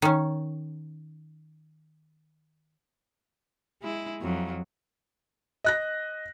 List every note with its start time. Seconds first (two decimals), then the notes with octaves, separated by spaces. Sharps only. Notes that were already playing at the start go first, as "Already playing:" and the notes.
0.02 D#3 C#4
3.82 G#3 E4
4.22 F2 F#3
5.64 D#5 F#6 A#6